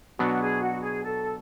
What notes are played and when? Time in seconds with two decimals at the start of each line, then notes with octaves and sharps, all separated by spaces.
0.19 B2 F#3 B3 D4 F#4
0.41 G#4
0.60 F#4
0.81 G#4
1.03 A4